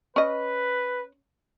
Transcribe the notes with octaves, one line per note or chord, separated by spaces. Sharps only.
C#4 B4 D#5